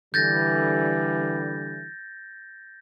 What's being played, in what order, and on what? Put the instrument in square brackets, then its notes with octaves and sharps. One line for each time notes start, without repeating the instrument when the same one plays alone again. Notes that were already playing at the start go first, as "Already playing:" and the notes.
[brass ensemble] D3 E3 G3 [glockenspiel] G6 A6 A#6